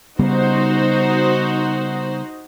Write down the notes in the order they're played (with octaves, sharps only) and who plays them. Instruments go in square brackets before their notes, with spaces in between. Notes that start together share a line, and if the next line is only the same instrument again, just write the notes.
[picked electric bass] C#3 G3 B3 [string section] D#4 F#4 C5